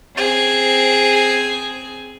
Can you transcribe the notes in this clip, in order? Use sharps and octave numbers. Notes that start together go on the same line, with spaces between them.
C4 G#4